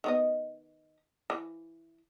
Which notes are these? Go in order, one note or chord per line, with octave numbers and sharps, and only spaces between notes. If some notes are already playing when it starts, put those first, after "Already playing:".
D#3 B3 D#5
E3